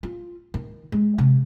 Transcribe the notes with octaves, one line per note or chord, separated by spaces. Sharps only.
F4
D#3
G#3
C3